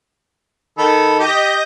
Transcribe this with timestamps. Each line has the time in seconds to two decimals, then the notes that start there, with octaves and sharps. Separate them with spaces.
0.78 D#3 A4 B5
1.19 G4 D#5 G6 A#6